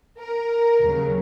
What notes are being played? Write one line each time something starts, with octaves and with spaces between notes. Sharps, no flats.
A#4
D#2 C#3 F#3